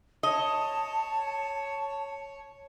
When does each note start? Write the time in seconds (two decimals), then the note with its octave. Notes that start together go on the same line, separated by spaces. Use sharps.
0.23 C#5 D#5 A5